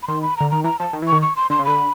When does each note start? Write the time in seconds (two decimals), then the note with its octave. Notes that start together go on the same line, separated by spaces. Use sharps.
0.03 B5
0.08 D#3 C6
0.22 B5
0.37 D3 A#5
0.51 D#3 A#5
0.64 E3 A#5
0.79 F3 A5
0.93 D#3
1.02 E3
1.07 D#3 C#6
1.22 C#6
1.36 C6
1.50 D3 C6
1.59 C#3
1.65 D3 B5